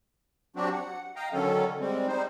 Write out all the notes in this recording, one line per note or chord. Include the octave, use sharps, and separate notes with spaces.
F#3 C4 D4 F#4 G4
F#5
D#5 F5 G5 A#5
D3 D#3 F#3 C#4 A4
G3 G#3 C4
G3 D#4 C5